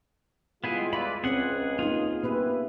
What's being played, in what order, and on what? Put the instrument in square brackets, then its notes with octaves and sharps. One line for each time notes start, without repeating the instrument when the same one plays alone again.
[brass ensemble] G3 G#3 F4 [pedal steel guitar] B3 E4 G#4
[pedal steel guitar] B4 D5 B5 [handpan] E5
[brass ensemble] C#2 [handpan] C4 C#4 C5 [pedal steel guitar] G#4 F#5
[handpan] A#3 D#4 [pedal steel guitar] F4 G#4
[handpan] A#3 B3 G4 [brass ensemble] B4 E5